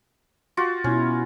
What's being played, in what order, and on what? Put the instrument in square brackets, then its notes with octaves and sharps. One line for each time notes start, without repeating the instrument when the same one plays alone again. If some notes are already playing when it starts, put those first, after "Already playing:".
[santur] F4 F#4
[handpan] B2 E4 [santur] C#4